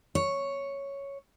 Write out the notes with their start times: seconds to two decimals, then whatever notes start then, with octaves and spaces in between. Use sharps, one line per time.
0.15 C#5